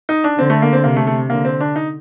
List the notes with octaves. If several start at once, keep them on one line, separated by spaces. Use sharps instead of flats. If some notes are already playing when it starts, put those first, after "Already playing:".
D#4
D4
D3 C4
A3
A#3
C4
C3 A#3
A3
A3
D3 A#3
C4
D4
D#4